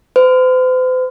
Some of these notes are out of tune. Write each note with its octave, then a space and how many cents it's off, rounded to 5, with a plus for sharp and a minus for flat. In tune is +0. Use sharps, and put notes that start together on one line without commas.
C5 -45